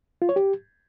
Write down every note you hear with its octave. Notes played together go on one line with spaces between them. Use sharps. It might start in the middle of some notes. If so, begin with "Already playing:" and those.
F4
C#5
G4